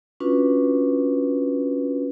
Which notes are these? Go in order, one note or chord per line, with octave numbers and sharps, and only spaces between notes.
C#4 D4 F4 F#4 B4